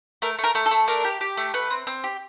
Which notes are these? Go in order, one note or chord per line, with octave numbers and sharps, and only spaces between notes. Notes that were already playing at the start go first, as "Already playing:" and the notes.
A3 A#4
A3 A#4
A3
A4
A3
D4 A#4
G4
G4
A3
A3 B4
C4
C4
G4